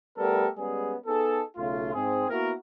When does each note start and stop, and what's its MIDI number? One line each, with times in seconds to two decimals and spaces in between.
0.18 0.47 55
0.18 0.47 57
0.18 0.47 59
0.18 0.47 67
0.18 0.47 69
0.18 0.47 70
0.58 0.94 55
0.58 0.94 56
0.58 0.94 59
0.58 0.94 61
0.58 0.94 68
1.07 1.41 59
1.07 1.41 63
1.07 1.41 68
1.07 1.41 69
1.57 1.93 35
1.57 1.93 49
1.57 1.93 57
1.57 1.93 65
1.94 2.29 44
1.94 2.29 60
1.94 2.29 68
2.29 2.52 58
2.29 2.52 59
2.29 2.52 64
2.29 2.52 66
2.29 2.52 70